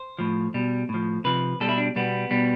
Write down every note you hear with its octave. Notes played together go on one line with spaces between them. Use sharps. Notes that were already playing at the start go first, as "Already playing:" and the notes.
Already playing: C5
A2 F3
B2 G3
A2
F3
C3 F3 B4
B2 G3 A4
E4
D4
B2 G3 B3
B2 G3